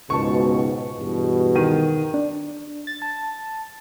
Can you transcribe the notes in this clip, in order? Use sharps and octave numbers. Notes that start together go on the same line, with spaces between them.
C#2 G#2 B2 A5 C#6
E2 G2 B2
D#3 D#7
D4
A6
A5